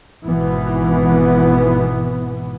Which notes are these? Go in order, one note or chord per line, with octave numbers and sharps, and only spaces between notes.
G#1 G#2 B2 E3 B3